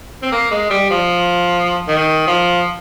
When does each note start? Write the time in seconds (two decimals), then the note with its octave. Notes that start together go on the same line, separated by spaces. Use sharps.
0.23 C4
0.32 A#3
0.51 G#3
0.70 G3
0.90 F3
1.88 D#3
2.27 F3